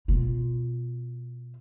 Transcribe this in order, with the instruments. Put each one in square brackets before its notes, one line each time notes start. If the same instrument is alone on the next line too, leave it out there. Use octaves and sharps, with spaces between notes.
[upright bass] B2 F4